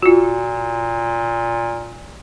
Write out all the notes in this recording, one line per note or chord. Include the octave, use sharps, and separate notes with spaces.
A#2 F4 F#4